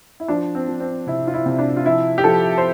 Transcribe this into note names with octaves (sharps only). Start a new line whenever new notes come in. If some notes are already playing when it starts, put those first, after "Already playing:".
E4
F3 D4
C4
F3
C4
C3 E4
F4
E4
C3
D4
F4
F3 E4
G4
F3 A4
C5